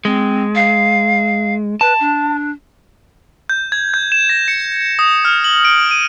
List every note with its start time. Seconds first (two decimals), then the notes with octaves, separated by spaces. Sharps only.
0.05 G#3 C4
0.55 F5
1.81 B4 A5
2.00 D4
3.49 G6
3.72 G#6
3.94 G6
4.12 E7
4.29 A#6
4.48 C#7
4.99 D#6
5.25 F6
5.44 F#7
5.65 D7
5.91 D#7